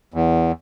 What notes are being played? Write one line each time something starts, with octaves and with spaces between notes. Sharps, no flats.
E2